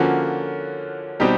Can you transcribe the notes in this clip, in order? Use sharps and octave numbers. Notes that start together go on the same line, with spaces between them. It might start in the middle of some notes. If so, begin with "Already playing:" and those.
Already playing: D3 F3 A#3 C#4 F#4
B2 G3 C4 D#4 G4